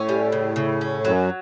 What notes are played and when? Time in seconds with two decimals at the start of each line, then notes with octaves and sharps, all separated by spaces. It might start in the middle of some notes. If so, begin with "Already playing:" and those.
Already playing: A2 C#4
0.09 G3
0.32 C#3
0.56 C#3
0.81 C#4
1.05 F#2 F#3